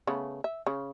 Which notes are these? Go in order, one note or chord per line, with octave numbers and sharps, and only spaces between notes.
C#3 A3 B3
E5
C#3